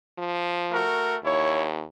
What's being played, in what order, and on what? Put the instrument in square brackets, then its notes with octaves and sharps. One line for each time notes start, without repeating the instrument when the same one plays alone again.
[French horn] F3
[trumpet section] A3 F#4 A#4
[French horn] D#2 [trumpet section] E4 C#5